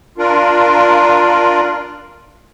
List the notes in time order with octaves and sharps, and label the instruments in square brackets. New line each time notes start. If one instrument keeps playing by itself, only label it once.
[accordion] D4 F4 A#4